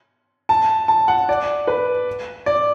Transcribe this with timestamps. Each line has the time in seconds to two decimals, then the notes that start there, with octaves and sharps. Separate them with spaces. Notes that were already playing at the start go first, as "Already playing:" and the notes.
0.49 A5
0.88 A5
1.08 F#5
1.29 D5
1.67 B4
2.46 D5